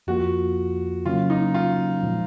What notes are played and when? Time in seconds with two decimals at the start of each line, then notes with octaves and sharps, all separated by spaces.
0.07 F2 F3 A#3 F4 F#4
1.06 C#3 F#3 A#3 C#4 F4
1.30 D#4
1.54 F4
2.03 A#2 F3 G#3